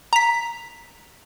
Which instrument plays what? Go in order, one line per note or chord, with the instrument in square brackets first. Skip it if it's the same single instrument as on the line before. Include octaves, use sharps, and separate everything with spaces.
[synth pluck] A#5 B6